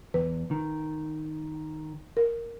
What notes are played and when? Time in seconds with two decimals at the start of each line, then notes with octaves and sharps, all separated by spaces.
0.14 E2 B4
0.51 D#3
2.17 A#4